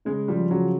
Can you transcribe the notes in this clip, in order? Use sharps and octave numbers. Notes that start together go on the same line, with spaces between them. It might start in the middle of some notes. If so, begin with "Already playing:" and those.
C#3 G#3
F3 G3
C#3 F#3